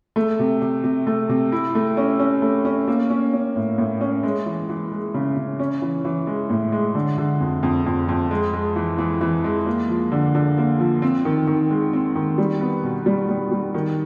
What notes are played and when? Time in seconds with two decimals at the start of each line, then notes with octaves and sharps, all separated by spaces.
0.16 A3
0.39 C3
0.61 C3
0.84 C3
1.07 A3
1.29 C3
1.52 E4
1.75 A3
1.97 C#4
2.19 C#4
2.42 A3
2.65 C#4
2.88 A#3
3.10 C#4
3.33 C#4
3.56 A2
3.78 A2
4.01 C#4
4.23 G#3
4.46 E3
4.69 E3
4.92 G#3
5.14 C#3
5.36 C#3
5.59 C#4
5.82 E3
6.05 E3
6.27 G#3
6.50 A2
6.72 G#3
6.95 D3
7.18 D3
7.40 F2
7.63 F2
7.86 F2
8.09 F2
8.31 G#3
8.53 G#3
8.76 E3
8.98 E3
9.21 E3
9.44 G#3
9.66 A#3
9.89 F3
10.11 D3
10.35 D3
10.58 A#3
10.79 F3
11.02 C4
11.25 D#3
11.47 D#3
11.70 G#3
11.93 C4
12.15 D#3
12.38 G3
12.61 B3
12.83 B2
13.06 G3
13.29 G3
13.51 G3
13.74 D#3